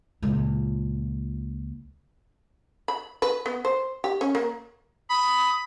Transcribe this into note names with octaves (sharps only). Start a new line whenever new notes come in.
C#2 A#2
B5
B4
B3
C5
G4
C#4
A#3
B5 D#6